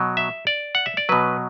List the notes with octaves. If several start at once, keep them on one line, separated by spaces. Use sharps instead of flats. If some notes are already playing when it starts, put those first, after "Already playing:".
Already playing: B2 F#3
E5
D5
F#5
E5
D5
B2 F#3 B4